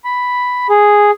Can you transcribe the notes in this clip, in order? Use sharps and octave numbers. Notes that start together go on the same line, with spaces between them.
B5
G#4